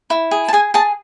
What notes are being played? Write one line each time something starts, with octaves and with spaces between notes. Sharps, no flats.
E4
G#4
A5
G#4 G#5
G#4 A5